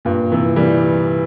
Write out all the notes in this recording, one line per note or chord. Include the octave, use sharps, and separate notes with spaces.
G2 A#2
C3 E3
E3 G3